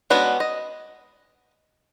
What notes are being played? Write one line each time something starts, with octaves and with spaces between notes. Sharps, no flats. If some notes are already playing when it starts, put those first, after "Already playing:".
G#3 B3 C#4 D4 F#4
D#5